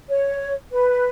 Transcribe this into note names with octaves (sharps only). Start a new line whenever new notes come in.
C#5
B4